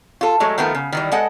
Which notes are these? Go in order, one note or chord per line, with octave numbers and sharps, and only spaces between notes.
F4 A4
F#3 G#3 A3
D#3 F3 A3 B3 A#4
C#3
D#3 E3 G3
G#3 A4 D#5 F#5